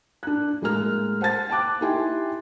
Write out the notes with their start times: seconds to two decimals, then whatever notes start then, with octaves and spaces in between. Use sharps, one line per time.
0.23 D4 F#6
0.62 A2 G#3 A#3 A#5 F6
1.21 C5 F#5 A5 A6
1.50 G5 A5 D6 F#6
1.81 D#4 E4 G4 G5 G#5 C6